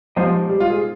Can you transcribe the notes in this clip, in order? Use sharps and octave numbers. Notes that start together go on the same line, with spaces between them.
F3 G#3 D#4 G4 C5 D#5
G3
F4
G#4